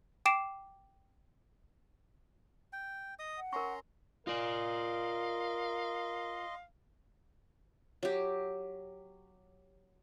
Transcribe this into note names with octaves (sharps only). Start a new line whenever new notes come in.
G5 D6 C7 D7 E7
G5
D#5 D#6
F#5
C#4 A#4 A#5 C6 C#6
F4 A#4 D5 D#5 F5 C6
F#3 G4